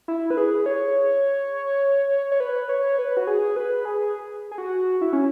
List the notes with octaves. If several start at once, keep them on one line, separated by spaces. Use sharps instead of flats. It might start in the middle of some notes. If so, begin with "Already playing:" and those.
E4
B4
G#4
C#5
C#5
B4
C#5
B4
F#4
G#4
B4
G#4
G#4
F#4
E4
C#4